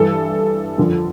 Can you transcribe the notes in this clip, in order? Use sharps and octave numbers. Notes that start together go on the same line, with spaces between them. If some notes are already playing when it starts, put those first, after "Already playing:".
Already playing: G2 E3 A4
F2 D3 F3